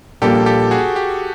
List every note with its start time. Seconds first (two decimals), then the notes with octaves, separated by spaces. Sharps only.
0.22 A#1 A#2 G3 A#3 G4 A4
0.46 G4 A4
0.71 F#4 G#4
0.96 G4